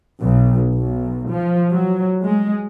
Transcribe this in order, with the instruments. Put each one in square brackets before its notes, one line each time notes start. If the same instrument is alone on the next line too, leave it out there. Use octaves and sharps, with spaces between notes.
[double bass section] B1
B1
F3
F#3
G#3